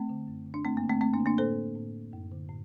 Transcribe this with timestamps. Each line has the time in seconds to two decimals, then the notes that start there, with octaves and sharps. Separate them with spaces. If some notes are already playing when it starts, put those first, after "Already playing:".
Already playing: A3 C4
0.09 D3
0.27 F#2
0.46 D3
0.54 D4
0.65 G2 A3 C4
0.77 A#3
0.84 D3
0.89 A3 C4
1.01 F#2 A3 C4
1.14 A#3 D4
1.20 D3
1.26 A#3 D4
1.38 A2 A4 C5
1.76 A2
2.13 F#2
2.32 D3
2.49 A2